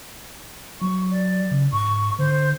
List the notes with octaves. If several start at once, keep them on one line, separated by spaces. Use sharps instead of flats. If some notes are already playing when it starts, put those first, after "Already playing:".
F#3 C#6
D5
C#3
G#2 C#6
D3 C5